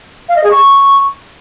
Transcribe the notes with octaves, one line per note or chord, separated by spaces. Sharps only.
F5
D#5
G#4
C#6